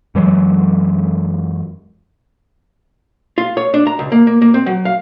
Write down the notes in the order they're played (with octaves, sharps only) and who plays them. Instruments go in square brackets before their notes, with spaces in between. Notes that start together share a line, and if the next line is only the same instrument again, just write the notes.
[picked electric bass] F#2 E3 F#3 G#3
[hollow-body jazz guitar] F4
C#5
D4
A#5
C#2
A#3
A#3
A#3
C4
F#3
F5